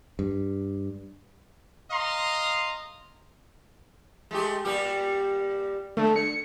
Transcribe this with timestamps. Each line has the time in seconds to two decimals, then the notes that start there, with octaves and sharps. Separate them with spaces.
0.19 G2
1.91 D#5 F5 A#5 C6
4.31 G#3 A3 G4
4.65 A#2 G3 G4
5.97 D3 A3
6.16 C#7